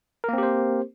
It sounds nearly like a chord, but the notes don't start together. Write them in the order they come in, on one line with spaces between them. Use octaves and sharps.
A#4 A#3 C4 G4 C5